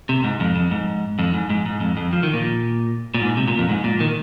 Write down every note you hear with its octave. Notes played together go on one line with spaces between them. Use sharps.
C3
G#2
F2
F2
G#2
F2
G#2
G#2
G#2
F2
F2
F3
D#3
A#2
A#2
G#2
C3
A#2
F2
G#2
A#2
D#3